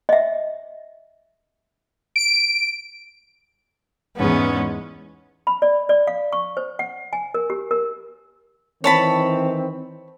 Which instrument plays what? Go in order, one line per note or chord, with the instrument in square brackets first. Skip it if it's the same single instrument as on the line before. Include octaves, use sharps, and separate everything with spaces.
[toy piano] D#5 E5
[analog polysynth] D7
[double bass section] E2 G#2 G#3 [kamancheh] B3 C#4
[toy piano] B5
D5
D5
F5
C#6
C5
F#5
G#5
A#4
G4
A#4
[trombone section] D#3 E3 C4 [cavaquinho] C#5 A5 B5